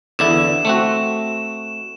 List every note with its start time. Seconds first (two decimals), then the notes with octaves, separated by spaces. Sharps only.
0.19 E2 D3 E4 E7
0.65 A3 C4 F#4